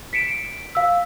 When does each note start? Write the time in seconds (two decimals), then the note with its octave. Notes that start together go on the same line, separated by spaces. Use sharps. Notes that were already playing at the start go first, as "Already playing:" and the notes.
0.13 B6 C#7 D7 E7
0.75 F5 E6